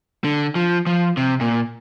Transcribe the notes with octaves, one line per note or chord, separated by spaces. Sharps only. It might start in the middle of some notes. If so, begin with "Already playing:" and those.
D3
F3
F3
C3
A#2